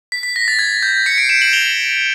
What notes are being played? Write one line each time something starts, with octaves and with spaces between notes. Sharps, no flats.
B6
B6
A#6
A6
G#6
G6
B6 C#7
C7 D7
D7 E7
E7 F#7
F7 G7